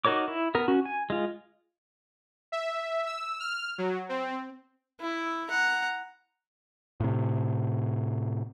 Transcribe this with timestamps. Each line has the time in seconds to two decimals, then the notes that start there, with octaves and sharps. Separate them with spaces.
0.05 D#4 F#4 A#4 C#5 D6
0.28 E4
0.55 B3 A#4
0.68 C#4 F#4
0.85 G#5
1.10 G#3 F4
2.52 E5
3.06 E6
3.40 F6
3.78 F#3
4.09 C4
5.00 E4
5.50 F#5 A#5
7.00 A2 C3